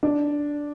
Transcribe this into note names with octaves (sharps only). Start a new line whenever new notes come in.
D4